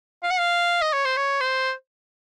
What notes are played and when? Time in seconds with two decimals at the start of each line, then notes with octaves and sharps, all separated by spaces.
0.23 F5
0.31 F#5
0.39 F5
0.82 D#5
0.93 C#5
1.05 C5
1.17 C#5
1.41 C5